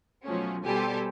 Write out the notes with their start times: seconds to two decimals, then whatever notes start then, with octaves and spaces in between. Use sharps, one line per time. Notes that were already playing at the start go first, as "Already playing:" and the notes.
0.24 B2 F3 F#3 A3 C#4
0.64 B2 G3 G4 A4 C5 G#5